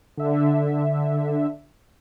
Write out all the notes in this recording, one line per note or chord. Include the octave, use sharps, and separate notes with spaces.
D3 E5